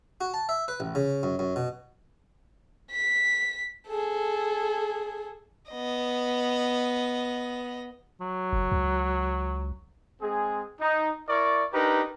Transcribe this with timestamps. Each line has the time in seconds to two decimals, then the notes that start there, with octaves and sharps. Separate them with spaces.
0.21 F#4
0.34 A5
0.49 E5
0.68 B4
0.80 A1
0.95 C#3
1.23 F#2
1.39 F#2
1.56 B2
2.91 B6
3.88 G#4 A4
5.70 B3 D#5
8.21 F#3
8.53 F#1
8.72 C#2
10.22 G#3 C4 G#4
10.81 D#4
11.29 E4 A#4 D5 C#6
11.73 D4 D#4 G4 A#4 B4